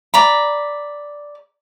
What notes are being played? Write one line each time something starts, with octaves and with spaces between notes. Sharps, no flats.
D5 A#5 B5